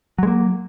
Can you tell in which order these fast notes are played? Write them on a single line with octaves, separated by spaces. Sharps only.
F#3 G#3 A#3